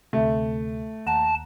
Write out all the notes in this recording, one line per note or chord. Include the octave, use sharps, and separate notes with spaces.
D2 C3 A3
D#2 F#5 A5 A#5